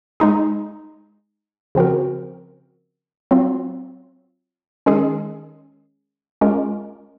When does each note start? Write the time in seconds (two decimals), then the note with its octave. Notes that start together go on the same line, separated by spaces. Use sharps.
0.20 G#3 D#4 G#4
1.75 C#3 F3 C4 F#4 A#4
3.31 F#3 C4 F4
4.86 D#3 G#3 C#4 G#4
6.41 G#3 C#4 F4 A#4